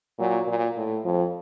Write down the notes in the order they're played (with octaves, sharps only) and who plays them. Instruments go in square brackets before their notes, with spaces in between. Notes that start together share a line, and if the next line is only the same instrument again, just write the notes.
[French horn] A#2 [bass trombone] F#3
[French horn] A#2
A2
[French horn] F2 [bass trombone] F3